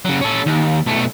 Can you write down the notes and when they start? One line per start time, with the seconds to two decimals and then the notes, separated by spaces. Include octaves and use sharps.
0.05 C#3 F#3
0.21 C#4 A4
0.46 D#2
0.86 B1 A3